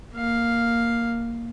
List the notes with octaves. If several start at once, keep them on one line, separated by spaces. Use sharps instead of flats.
A#3 F5